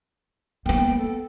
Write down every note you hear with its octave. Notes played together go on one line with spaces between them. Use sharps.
A#3 B3 G5
A4